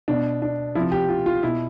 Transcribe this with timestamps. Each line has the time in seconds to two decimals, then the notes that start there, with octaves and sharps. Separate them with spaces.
0.08 B2 D4
0.42 D4
0.75 F3 E4
0.79 C3
0.92 G4
1.09 F4
1.26 F4
1.43 B2 E4